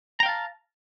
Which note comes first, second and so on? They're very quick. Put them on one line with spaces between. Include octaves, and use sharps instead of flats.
A#5 G5 F5 A5